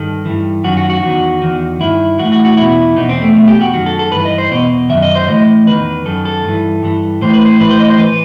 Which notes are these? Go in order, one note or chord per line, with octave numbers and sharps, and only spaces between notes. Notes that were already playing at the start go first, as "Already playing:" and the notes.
Already playing: G2 D#3 A4
G2 E3
F#2 D#3 F#4
F#4
F#4
E2 D#3
E2 D#3
G2 D#3 E4
A2 E3 F#4
F#4
F#4
E2 B2 E4
E2 B2 D#4
C4
A3
E2 B2 A3
G4
F#4
F#2 D#3 F#4
A4
A4
G2 E3 B4
D#5
C5
E2 B2 D#5
F#2 D#3 E5
D#5
C5
A2 E3 D#5
E2 D#3 B4
F#2 D#3 A4
A4
G2 E3
G2 E3
A2 E3 C5
B4
C5
A2 E3 B4
C5
D#5
C5
E3 B4